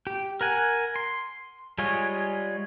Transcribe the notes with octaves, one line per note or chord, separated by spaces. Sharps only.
G4
A#4 F#5 G#5
C6
G3 G#3 F4 G#4 C#5